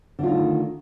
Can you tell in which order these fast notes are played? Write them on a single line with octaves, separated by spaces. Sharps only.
D3 F4 D#4 A3 D#3